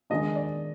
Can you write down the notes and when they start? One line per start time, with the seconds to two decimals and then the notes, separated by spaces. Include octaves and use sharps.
0.10 D#3 G#3 D4 D#5
0.36 D5